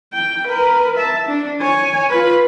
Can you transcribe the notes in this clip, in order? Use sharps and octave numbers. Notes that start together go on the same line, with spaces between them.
G5
A#4 B4
E5 A5
D4
C#5 G#5
F4 B4